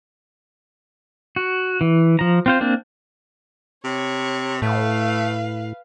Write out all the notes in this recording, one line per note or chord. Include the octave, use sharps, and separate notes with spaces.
F#4
E3
F3 A#5
C4 F4 C5
A#3 C4 D4
C3 C#5 C#6
A2 A3 B4 F5